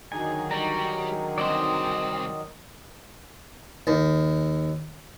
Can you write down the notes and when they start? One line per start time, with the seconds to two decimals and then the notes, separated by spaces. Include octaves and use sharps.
0.12 D3 D#3 F#3 D#4 G#4 G#5
0.51 G3 C#5 A#5
1.38 C2 C4 D5 D#5 C6
3.87 D#2